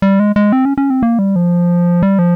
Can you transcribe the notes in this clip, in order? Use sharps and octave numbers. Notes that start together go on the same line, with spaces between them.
G3
G#3
G#3
C4
C#4
C#4
C4
A#3
G3
F3
G3
F3